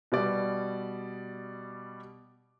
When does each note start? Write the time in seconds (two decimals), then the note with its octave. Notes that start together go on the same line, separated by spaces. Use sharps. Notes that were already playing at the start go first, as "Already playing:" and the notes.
0.12 B2 G3 D5